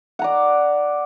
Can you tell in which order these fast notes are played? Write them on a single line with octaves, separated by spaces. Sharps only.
F#5 A#5 D5